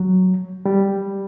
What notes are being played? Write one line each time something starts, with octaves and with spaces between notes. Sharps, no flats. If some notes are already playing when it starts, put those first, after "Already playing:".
Already playing: F#3
G3